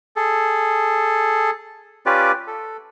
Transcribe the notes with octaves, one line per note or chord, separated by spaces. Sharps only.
G#4 A4
C#4 F4 G4 B4 D5
A4